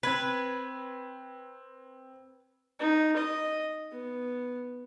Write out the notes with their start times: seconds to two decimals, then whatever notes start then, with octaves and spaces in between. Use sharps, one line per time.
0.03 C4 B4 G#6 B6
2.79 D#4
3.16 D#5
3.91 B3